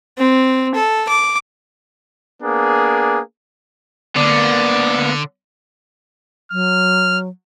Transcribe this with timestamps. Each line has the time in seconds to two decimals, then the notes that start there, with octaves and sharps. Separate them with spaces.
0.18 C4
0.75 A4
1.09 D6
2.42 A#3 B3 D4 G#4
4.16 D3 A#3 B3 D5
6.52 F#3 F6